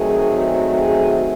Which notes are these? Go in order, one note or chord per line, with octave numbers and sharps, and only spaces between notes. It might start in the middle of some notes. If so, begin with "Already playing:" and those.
Already playing: D#3 F#3 A3 C4 G#4
G#4